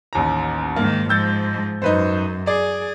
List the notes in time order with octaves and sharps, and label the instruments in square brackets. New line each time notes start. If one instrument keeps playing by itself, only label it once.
[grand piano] A1 D#2 A#5
[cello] G#2 D#3 [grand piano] A#3
[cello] G#2 F3 [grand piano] E6 G6 A6
[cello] F#2 [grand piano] D#4 B4 C5
[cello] G#4 [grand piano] D5